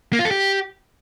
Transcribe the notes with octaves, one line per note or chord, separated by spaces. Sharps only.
A#3
F4
A4
G4